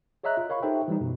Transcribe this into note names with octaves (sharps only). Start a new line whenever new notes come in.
G#4 C#5 D#5 E5 A#5 F#6
F4
A#4 C#5 F5 B5 C#6
D#4 G4 A4 C5 E5 G5
E3 G3 D#4
F#2 B2